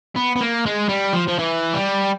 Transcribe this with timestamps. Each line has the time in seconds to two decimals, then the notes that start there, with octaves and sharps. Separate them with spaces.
0.16 B3
0.36 B3
0.41 A#3
0.66 G#3
0.89 G3
1.13 F3
1.28 F3
1.39 E3
1.74 G3